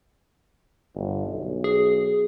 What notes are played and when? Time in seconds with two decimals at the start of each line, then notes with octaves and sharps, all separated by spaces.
0.95 G1
1.27 B1
1.64 G#4